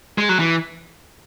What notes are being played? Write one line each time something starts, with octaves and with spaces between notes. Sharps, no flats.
G#3
F#3
E3